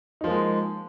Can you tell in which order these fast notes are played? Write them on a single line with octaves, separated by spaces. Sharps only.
D#4 F3 A#3 G#3